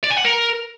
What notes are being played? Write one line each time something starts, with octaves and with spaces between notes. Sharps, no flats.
D5
G#5
F#5
A#4